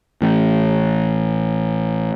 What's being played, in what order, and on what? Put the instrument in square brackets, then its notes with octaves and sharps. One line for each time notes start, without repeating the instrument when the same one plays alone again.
[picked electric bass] A1 A2